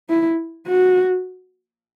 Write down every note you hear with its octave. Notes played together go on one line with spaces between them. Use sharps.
E4
F#4